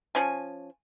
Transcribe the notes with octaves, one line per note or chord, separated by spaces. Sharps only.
F3 C#4 G#5